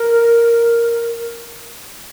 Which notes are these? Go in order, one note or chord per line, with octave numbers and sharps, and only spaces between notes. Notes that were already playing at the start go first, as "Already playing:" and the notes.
Already playing: A#4